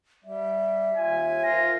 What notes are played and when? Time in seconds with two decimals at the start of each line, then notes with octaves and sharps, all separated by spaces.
0.24 G3 E5
0.96 D#2 F4 G#5
1.43 D#3 F4 C5 A#6